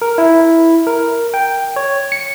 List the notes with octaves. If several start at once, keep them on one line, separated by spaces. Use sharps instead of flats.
A#4
E4
A#4
G5
C#5
C#7